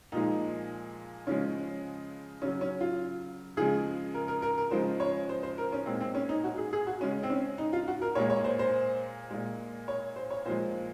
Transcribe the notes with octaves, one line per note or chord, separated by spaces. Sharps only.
A#2 F3 G#3 D#4
C#3 F3 G#3 C#4
C#3 F#3 C#4
C#4
F4
C#3 F3 G#3 G#4
A#4
A#4
A#4
A#4
C#3 F3 G#3 C5
C#5
C5
C5
A#4
C#4
A#2 G#3 C4
C4
C#4
D#4
F#4
G#4
G#4
F#4
C#3 G#3 C#4
C4
C#4
D#4
F4
F#4
A#4
A#2 G#3 C#5
C#5
C5
C5
A#2 G#3
C#5
C5
C#5
A#2 F3 G#3 C5